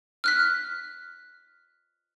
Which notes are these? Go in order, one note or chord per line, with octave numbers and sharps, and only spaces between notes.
F6 F#6 B6